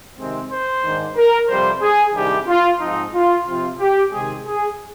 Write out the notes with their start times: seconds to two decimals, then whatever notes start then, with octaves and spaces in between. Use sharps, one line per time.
0.19 C3 D#3 G#3 C4
0.51 C5
0.84 G#2 D#3 A#3 D4
1.17 A#4
1.49 F2 C3 G3 A#3 C5
1.82 G#4
2.15 C2 C3 D#3 G3 D4 G4
2.48 F4
2.80 G#2 F3 C4 D#4
3.14 F4
3.47 C3 F3 C4 F4
3.79 G4
4.12 C3 D#3 G#3 C4 G#4
4.46 G#4